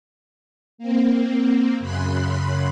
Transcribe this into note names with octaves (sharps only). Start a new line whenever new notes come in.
A#3 C4
F#2 C#3 B5 C6 F#6